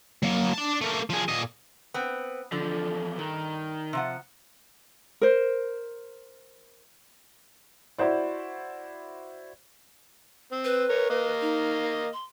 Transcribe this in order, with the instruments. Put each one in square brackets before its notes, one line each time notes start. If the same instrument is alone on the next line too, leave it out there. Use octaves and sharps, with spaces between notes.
[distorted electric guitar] F#3 A#3
D4 A5
A3 A#3
F3 G#4
A#2 D#5
[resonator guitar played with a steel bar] B3 C4
[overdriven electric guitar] E2 F3 [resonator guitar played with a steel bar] D3
[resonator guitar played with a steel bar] G2 [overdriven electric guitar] D#3
[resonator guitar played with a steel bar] C3 F3 F#5
[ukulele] A#4 C5
[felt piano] E4 F#4 C5 D5
[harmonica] C4
[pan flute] B4
[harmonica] A#4 C#5
A#3 D#5
[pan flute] D#4
C6